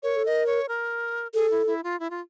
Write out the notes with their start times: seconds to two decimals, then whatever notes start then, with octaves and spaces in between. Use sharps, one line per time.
0.03 A#4 C#5
0.16 A4
0.26 A#4 D#5
0.47 C#5
0.69 A#4
1.34 G#4 A4
1.51 E4
1.67 E4
1.84 F4
2.00 E4
2.10 F4